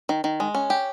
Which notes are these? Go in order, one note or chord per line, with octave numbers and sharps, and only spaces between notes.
D#3
D#3
G#3
C#4
G4